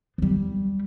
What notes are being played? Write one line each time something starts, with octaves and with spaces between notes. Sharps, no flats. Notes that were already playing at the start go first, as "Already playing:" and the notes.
F3
G3